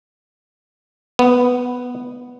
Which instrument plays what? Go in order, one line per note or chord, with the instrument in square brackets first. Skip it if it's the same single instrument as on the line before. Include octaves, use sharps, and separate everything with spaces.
[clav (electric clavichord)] B3